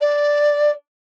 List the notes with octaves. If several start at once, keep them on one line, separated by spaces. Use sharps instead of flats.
D5